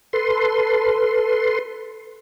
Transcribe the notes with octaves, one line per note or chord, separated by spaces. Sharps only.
A4 B4 C6